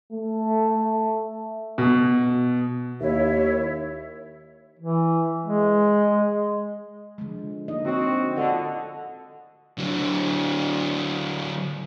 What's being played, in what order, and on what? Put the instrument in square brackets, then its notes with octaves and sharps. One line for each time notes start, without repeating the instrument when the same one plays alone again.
[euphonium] A3
[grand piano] B2
[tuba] D#2 [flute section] E4 C#5 E5
[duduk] E3
G#3
[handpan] D3 F3 G#3
A#3 D#4 D#5
[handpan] D3 C#5 [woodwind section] C4 F#4
[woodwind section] D3 [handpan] F4 A4 D#5
[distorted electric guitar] D3 F#3